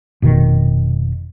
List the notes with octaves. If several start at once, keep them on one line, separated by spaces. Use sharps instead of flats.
F1 B2 D#3